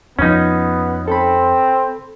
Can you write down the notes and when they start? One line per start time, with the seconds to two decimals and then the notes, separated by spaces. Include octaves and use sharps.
0.19 F2 F3 B3 C#4 D#4
1.08 C4 A4 B5